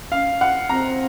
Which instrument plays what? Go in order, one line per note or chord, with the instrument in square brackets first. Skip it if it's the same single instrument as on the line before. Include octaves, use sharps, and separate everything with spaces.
[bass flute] C#4 [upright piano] F5
[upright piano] F#5
[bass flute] C4 [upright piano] A#5